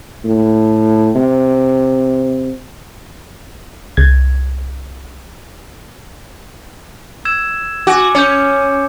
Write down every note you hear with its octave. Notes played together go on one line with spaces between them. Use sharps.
A2
C3
C2 G#6
E6 G#6 E7
F#4 G#5 D6
C#4 G6 C#7